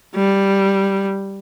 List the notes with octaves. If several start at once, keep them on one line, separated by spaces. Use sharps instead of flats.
G3